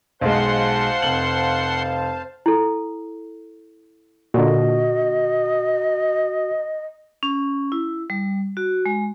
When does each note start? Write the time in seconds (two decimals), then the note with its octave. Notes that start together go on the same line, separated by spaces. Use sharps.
0.21 B1 G#3 C5 F5 F#5 A5 C6
1.02 F1 F#7
2.46 E4 A4
4.34 A#2 D3 F#4 D#5
7.23 C#4
7.72 E4
8.10 G3
8.57 F#4
8.86 G#3